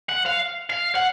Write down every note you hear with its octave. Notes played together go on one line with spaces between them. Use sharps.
F#5
F5
F5
F#5